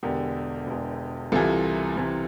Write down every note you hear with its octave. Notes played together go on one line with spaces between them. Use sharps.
E1 E2 D3 G4 A#4
E1 E2 D3
C2 C3 E3 F4 A4
C2 C3 E3